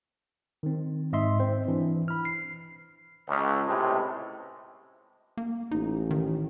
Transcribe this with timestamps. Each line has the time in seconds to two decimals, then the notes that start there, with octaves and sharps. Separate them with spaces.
0.63 D#3 C4
1.13 G#2 D#5 E5 C6
1.40 C4 C5
1.68 E3 D4
2.08 B5 F6
2.25 C7
3.29 C#2
3.67 C#2 A2 C3 G#3
5.37 A#3
5.71 A1 D#4
6.11 D#3